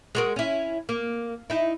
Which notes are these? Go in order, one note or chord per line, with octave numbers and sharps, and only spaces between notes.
G#3 F#4 A#4
C#4 E4
A#3
D#4 E4